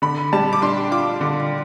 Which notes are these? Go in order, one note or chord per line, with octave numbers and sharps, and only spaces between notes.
D3 B5
G3 A5
D6
D4 C6
F4 D6
D3